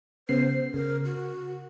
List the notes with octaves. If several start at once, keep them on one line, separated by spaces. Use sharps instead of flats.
C#3 B3 C5 C7
C#3 A#4
F#4